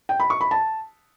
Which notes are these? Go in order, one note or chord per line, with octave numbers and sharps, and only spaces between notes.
G5
B5
C#6
B5
A5